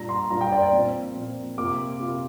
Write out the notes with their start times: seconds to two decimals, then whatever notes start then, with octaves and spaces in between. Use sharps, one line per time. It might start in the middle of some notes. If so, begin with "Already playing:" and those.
Already playing: A#2 G3 D4 F4 A#5
0.09 C6
0.30 A#2 G3 D4 F4 A#5
0.41 G5
0.52 D5
0.62 D5
0.73 A#2 F3 C4 F4
1.15 A#2 F3 C4 F4
1.58 C3 A#3 F4 D6
2.00 C3 A#3 F4